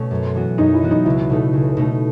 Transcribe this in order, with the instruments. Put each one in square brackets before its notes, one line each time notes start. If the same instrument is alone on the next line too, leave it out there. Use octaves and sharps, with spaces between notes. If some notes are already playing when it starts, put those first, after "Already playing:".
Already playing: [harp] B2 A3 C#4
F#2
E3 B3 F#4
[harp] F#2 [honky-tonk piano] D#4
[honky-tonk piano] E4
[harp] E3 B3 F#4
[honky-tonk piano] D#4
[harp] C#2 [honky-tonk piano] E4
[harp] B2 A3 D#4
C#2
B2 A3 D#4